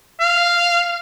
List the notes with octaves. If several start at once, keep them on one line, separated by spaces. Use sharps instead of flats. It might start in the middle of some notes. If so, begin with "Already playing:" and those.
F5